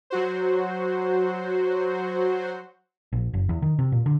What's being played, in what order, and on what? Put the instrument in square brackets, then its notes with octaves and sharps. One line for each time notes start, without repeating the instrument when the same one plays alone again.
[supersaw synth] F#3 F#4 C5
[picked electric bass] A#1
F#1
E2
D#3
C3
A#2
D3